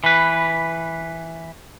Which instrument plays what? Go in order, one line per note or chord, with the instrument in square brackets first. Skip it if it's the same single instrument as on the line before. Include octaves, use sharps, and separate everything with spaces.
[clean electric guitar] E3 B4